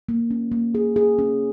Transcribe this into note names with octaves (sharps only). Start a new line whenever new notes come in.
A#3
C#4
A#3
G#4
G#4
C#4